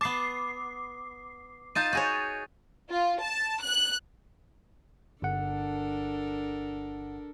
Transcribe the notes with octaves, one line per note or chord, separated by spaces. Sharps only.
B3 A5 D6 C7
D#4 F4 A5 G6 A6 D#7
F#4 G#4 C#5
F4
A5
F#6
G1 D4 A4 A#4 F#5